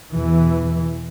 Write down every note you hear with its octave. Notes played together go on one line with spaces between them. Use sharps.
E2 B2 E3